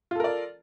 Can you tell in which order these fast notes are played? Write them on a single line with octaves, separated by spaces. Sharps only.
F4 A4 A#4 D5